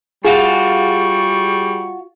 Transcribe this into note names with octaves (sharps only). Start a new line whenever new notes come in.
G3 F4 F#4 G#4 F5 C#6